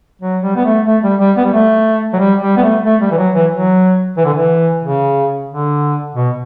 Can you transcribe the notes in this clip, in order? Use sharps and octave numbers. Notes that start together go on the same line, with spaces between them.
F#3
G3
B3
A3
A3
G3
G3
B3
G3
A3
F#3
G3
G3
B3
A3
A3
G3
E3
F#3
E3
F#3
E3
D3
E3
C#3
D3
B2